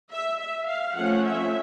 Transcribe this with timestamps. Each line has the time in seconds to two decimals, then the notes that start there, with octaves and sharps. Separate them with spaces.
0.11 E5
0.41 E5
0.68 F5
0.97 F3 A3 C#4 F#5
1.25 E5